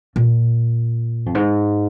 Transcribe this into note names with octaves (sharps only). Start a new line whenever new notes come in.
A#2
F2
G#2